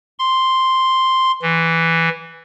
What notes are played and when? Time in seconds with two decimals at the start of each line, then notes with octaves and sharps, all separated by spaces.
0.19 C6
1.42 E3